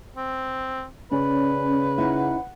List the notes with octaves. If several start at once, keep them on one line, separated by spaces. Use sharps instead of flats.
C4
C#3 C#4 B4 D5
C#4 D#4 E4 F#5